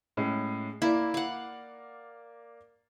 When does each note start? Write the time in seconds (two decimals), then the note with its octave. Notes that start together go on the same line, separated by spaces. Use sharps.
0.17 A2 G#3 C#4
0.82 A#3 E4 A#4 D5
1.14 F5 F#5